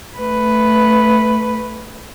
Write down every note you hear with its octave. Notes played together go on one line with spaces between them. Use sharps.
A3 B4